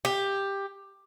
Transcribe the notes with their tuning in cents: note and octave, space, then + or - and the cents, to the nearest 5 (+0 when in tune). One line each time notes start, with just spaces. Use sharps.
G4 +10